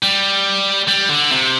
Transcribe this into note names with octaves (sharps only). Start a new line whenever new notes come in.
G3
G3
D3
C3